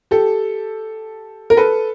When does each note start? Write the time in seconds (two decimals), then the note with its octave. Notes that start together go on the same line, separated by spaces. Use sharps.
0.11 G4 A4
1.50 A#4
1.57 A4 B4